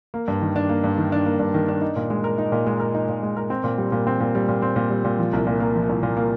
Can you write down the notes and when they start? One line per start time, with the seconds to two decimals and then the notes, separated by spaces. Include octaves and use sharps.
0.14 A#3
0.28 G2
0.42 D#3
0.56 D4
0.69 A#3
0.84 G2
0.98 D#3
1.12 D4
1.26 A#3
1.40 G2
1.54 D#3
1.68 D4
1.81 D#4
1.96 A#2
2.10 G#3
2.24 A#4
2.38 D#4
2.52 A#2
2.66 G#3
2.80 A#4
2.94 D#4
3.09 A#2
3.23 G#3
3.37 A#4
3.50 C4
3.64 A#2
3.78 G3
3.92 A#2
4.07 C4
4.20 A#2
4.35 G3
4.48 A#2
4.62 C4
4.76 A#2
4.90 G3
5.05 A#2
5.19 F3
5.33 C2
5.47 A#2
5.60 A#3
5.75 F3
5.89 C2
6.03 A#2
6.17 A#3